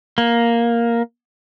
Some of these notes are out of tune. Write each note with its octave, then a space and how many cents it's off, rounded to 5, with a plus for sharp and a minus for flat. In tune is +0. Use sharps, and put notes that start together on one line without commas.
A#3 +5